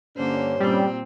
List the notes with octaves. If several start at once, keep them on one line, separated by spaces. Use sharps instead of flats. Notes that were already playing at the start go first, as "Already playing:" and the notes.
G2 D3 A#3 C#4 C5
A#2 G3 C4